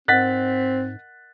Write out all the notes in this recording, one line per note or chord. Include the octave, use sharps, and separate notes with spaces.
G#2 C4 A#4 D#5 F#5 F#6 A6 B6